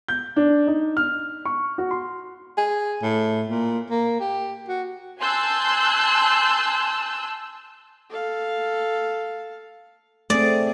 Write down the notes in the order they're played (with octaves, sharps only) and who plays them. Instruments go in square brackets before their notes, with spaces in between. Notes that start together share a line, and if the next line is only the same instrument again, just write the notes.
[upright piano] G6
D4
D#4
F6
C#6
F#4
C6
[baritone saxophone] G#4
A2
A#2
A#3
G4
F#4
[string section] G#5 A5 C6 E6 F#6 G6
[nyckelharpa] A4 F5
[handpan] A3 C4 [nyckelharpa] G#4 [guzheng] D5